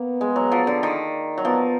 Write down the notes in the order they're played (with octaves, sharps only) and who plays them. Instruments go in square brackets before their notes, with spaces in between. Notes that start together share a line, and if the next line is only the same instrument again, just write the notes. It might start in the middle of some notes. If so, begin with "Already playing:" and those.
Already playing: [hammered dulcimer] A#3 [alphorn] B3
[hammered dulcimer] G#3
F#3
F3
D3
D#3
F#3
[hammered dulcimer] F3 [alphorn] B3